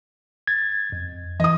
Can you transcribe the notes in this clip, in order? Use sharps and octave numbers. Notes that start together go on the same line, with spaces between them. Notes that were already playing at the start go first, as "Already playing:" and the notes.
G#6 A6
F2
E3 D#5 D#6